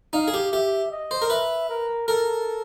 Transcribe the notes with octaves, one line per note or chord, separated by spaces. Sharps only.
D#4 F5
G#4
G4
G4 E5
D#5
C5
A#4
B4 E5
A#4
A4 A#4